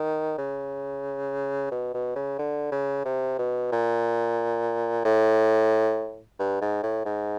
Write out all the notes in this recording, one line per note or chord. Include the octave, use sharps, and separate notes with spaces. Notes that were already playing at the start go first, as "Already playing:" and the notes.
Already playing: D#3
C#3
B2
B2
C#3
D3
C#3
C3
B2
A#2
A2
G2
G#2
A2
G#2